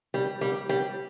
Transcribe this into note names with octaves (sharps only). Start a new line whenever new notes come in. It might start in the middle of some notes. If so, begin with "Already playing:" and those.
G3
G3
G3